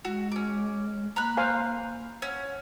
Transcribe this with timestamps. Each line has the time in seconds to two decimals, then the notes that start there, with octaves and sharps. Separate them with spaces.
0.05 G#3 F#4
0.32 C#4 D6
1.16 A#3 A#5 B5 F#6
1.37 C5 F5 G#5
2.22 C#4 F#5